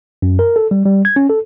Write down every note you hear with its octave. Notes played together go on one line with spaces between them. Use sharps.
F#2
A#4
A4
G3
G3
G#6
C#4
A4